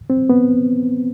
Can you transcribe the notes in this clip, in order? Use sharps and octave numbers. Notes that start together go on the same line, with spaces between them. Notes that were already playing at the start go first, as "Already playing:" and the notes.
C4
B3